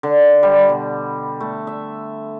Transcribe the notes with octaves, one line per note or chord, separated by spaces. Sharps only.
D3
G3
B2
A3
E5